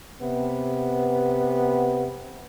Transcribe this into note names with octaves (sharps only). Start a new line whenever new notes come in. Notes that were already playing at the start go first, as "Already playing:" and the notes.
C3 B3